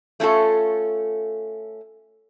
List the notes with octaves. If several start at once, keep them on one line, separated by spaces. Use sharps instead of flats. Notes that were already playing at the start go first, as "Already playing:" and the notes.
A3 C#4 F4 A4